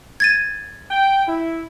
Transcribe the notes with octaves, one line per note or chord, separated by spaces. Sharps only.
G#6 A6 D#7
G5
E4